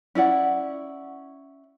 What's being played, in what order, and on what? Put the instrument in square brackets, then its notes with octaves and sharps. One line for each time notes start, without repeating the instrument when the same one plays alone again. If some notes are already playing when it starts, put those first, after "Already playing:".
[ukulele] C#4 E4 D5 F#5